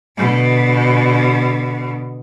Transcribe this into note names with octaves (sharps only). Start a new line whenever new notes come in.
B2 D3